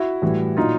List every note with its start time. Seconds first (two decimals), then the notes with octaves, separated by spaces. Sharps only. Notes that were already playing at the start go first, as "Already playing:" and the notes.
Already playing: E4 F#4
0.22 A2 E3 G3
0.57 A#2 F#3 D#4 F4